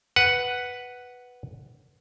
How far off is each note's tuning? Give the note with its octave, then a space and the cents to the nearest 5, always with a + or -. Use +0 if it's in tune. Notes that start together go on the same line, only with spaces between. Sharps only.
B4 +0 F#5 +5